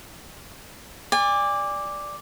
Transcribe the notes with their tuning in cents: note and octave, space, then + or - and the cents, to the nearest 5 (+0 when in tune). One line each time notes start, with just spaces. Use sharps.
D5 +0 G#5 -40